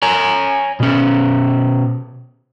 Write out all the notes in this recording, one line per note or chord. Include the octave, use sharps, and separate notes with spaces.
C#5 G#5 A#5
B2 C#4